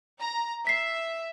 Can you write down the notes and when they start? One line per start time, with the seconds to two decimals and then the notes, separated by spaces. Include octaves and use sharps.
0.19 A#5
0.67 E5 B6 C7